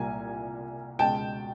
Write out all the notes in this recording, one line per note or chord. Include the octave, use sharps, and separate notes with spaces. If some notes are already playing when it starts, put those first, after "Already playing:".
Already playing: C2 A#2 G3 A#3 G#5
C#2 B2 G#3 G5 A5